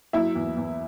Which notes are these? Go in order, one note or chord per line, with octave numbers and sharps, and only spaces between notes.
F#3 E4 E5
E2
E2